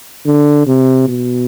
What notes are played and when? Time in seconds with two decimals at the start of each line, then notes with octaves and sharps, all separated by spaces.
0.26 D3
0.67 C3
1.08 B2